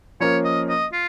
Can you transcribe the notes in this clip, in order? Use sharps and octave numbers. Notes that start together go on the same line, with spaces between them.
F3 A#3 C#4 A#4 C#5
D#5
D#5
F4